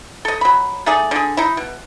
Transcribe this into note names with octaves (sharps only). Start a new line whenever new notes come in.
A4 D#5
F#3 B5
A3 D#4 G#4 D5
D3 G#4
D#4 E4
B2